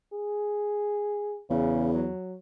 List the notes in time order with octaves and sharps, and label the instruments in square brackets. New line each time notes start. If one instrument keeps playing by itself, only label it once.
[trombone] G#4
[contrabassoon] E2 [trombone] C#3
[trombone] F#3